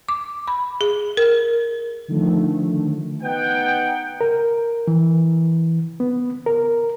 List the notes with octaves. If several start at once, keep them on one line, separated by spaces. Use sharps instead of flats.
D6
B5
G#4
A#4
D3 D#3 F3 A3
B3 D#4 F#5 G5
A#4
E3
B3
A#4